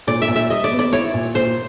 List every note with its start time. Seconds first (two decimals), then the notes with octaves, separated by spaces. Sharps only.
0.07 A#2 D5
0.22 E5
0.28 A#2
0.36 E5
0.50 G3 D#5
0.64 D5
0.72 B3
0.79 D5
0.93 E4 C#5
1.14 A#2
1.35 A#2 C5